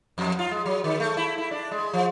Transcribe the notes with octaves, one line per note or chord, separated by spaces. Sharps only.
F2
F4
G#3
F#3
D#3
A3
E4
E4
D4
G#3
F3